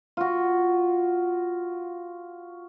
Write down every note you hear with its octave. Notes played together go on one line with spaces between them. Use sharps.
F4 F#4